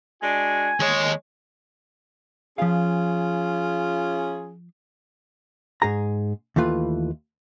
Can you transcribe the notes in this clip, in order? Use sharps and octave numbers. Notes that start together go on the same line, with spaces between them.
G#3 D4 F#4 G#5
D#2 G#3 C#5
F3 C#4 F4 G#4 F5
G#2 G#4 A#5
D#2 E3 A3 F4 B4